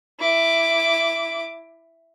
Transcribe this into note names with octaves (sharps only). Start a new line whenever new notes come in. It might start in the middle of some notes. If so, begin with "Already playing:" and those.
E4 D6